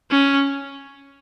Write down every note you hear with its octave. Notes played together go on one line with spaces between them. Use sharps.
C#4